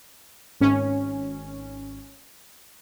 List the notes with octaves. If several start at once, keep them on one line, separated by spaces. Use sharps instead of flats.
G#1 C#4